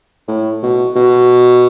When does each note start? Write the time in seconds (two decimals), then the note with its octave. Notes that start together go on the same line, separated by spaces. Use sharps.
0.28 A2
0.62 B2
0.96 B2